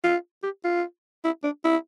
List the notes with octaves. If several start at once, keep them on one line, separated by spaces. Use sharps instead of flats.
F4
G4
F4
E4
D4
E4